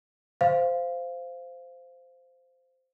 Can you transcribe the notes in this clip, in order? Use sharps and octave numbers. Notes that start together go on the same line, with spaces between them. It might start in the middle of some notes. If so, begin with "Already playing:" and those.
C5 F5